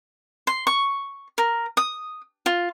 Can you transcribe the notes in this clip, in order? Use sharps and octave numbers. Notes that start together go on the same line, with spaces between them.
C6
C#6
A#4
D#6
F4